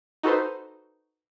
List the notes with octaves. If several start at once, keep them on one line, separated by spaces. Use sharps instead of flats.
D#4 F#4 A4 B4 C5